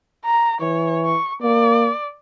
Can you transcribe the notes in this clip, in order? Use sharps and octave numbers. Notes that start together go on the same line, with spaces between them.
A#5
E3 C#5
C#6
A#3 D5